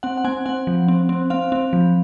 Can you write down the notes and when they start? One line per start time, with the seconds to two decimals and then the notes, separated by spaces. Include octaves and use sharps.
0.03 C4 F#5
0.17 F#5
0.25 C4 G#5
0.46 C4 F#5
0.67 F3
0.88 C4
1.09 C4
1.30 C4 F5
1.52 C4
1.73 F3